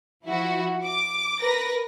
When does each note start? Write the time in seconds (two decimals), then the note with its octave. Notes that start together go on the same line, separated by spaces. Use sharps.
0.25 F3 E4 F#4
0.84 D6
1.41 A#4 B4 A#6